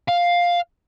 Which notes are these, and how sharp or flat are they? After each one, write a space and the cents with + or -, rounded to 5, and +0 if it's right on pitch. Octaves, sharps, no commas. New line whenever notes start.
F5 +5